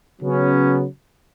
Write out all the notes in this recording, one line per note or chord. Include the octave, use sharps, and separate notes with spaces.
C#3 F#3 B3 C#4